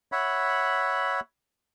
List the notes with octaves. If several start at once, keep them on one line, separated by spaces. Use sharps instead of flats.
C#5 E5 F#5 B5